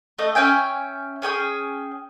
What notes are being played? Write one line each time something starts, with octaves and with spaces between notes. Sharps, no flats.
A3 D#5
C#4 E5 G5 G#5
C#4 G#4 G5 D#6